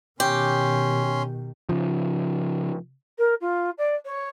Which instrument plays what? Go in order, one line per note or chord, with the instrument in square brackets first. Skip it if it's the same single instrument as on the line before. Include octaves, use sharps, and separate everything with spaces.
[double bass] B2 D#3 [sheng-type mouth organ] C#4 C6 [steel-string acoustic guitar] G4
[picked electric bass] C#3 F3
[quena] A#4
F4
D5
C#5